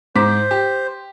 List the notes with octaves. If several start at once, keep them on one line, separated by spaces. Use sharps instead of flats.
G#2 C5 D6 B6
G4